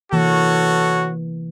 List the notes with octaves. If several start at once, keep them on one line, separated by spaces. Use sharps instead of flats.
C3 E3 A#3 F#4 A4 C#5